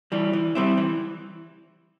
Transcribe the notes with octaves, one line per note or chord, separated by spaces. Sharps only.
E3 G3
E3
G3 C4 E4
E3